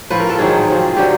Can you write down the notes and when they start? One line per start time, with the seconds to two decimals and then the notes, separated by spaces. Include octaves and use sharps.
0.10 A2 F3 B4
0.20 A#4
0.30 A4
0.39 G#2 D#3 F#3 G#4
0.68 C3 F3
0.97 D3 F#3 G4